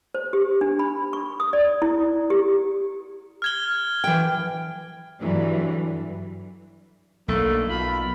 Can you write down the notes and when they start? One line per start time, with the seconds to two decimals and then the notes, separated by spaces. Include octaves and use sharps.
0.14 C5
0.33 G4
0.61 D4
0.79 B5
1.13 C#6
1.40 D#6
1.53 D5
1.82 E4
2.30 G4
3.42 F6 G#6 G7
4.04 E3 G5
5.19 G2 D3 E3 F#3
7.28 B1 D3 A3 A#3
7.69 B2 F4 B5